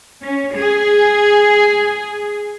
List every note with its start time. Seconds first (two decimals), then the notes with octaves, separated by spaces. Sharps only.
0.23 C#4
0.56 G#4